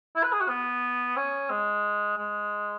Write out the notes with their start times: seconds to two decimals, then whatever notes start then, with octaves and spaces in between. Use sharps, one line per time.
0.16 E4
0.23 B4
0.33 G#4
0.41 F#4
0.49 B3
1.17 C#4
1.50 G#3
2.17 G#3